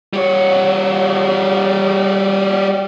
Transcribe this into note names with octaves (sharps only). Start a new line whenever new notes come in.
G3 C#5